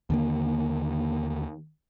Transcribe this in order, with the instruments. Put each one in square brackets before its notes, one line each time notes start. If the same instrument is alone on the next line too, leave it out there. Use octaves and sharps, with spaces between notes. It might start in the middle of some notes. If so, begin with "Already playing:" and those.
[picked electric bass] D#2 D3 A#3